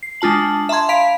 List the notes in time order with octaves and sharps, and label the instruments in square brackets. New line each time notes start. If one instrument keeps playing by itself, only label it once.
[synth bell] C7
G#3 D4 F4 A5 F#7
E5 A5 A#5 C6 G#6
F5 B5 B6 D7